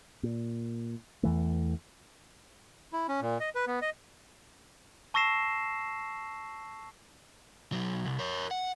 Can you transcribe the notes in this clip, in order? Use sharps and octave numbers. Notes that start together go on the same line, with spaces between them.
A#2
E2 E3 A3
E4
C#4
A#2
D#5
B4
B3
D#5
A5 C#6 E6 A#6 C7 E7
B1 F#3
C2
A#4 C#5
F#5